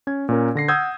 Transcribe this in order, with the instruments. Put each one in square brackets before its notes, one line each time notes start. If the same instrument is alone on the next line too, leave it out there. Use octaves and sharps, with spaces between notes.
[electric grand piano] C#4 G#6
A#2 C#4 A#4
D3 A#6 C7
F#5 D#6 E6 G6 G#6